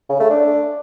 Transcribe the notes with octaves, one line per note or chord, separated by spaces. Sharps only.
C#3
A3
D4